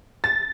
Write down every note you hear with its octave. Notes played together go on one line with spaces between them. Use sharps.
A6